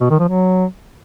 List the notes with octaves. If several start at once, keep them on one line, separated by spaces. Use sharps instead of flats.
B2
D#3
F3
F#3